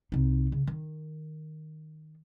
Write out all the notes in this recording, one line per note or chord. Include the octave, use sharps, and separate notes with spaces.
C2 D#4
C#3
D#3